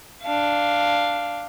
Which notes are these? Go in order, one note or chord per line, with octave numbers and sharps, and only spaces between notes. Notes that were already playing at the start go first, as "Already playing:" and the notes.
D4 F5